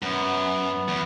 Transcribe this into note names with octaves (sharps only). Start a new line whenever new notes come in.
F#2 B3
E2